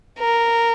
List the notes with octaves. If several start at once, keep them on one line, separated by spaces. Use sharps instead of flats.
A#4